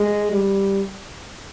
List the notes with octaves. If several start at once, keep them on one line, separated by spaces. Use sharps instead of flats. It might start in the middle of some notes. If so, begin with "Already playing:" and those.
Already playing: G#3
G3